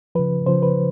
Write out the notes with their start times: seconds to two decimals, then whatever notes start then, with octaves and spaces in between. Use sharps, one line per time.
0.15 C#3 F3 B4
0.46 C#3 F3 C5
0.63 B4